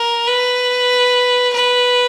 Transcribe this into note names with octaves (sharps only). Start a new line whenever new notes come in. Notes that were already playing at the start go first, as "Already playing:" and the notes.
Already playing: A#4
B4
B4